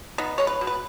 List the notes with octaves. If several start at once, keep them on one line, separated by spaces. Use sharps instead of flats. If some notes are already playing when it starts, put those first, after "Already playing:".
B3 D#4
G#3 C#5
B4
B2
B4